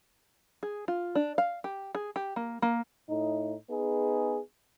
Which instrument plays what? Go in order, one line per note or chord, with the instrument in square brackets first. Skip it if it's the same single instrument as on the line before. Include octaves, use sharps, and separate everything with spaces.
[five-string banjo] G#4
F4
D4
F5
G4
G#4
G4
A#3
A#3
[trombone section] A2 D#4
B3 D#4 G#4